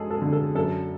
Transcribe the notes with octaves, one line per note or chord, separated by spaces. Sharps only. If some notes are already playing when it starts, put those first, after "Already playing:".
Already playing: F#2 G#3 G#4 A4
A4
D3
A4
F#2 A4